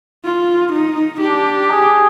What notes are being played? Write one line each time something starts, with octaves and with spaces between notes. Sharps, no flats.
F4
D#4
D4 G4
G#4